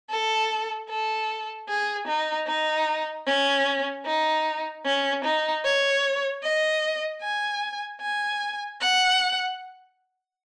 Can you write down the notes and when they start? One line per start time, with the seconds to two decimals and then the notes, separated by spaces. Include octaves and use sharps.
0.10 A4
0.89 A4
1.69 G#4
2.08 D#4
2.47 D#4
3.27 C#4
4.06 D#4
4.85 C#4
5.25 D#4
5.65 C#5
6.43 D#5
7.22 G#5
8.01 G#5
8.81 F#5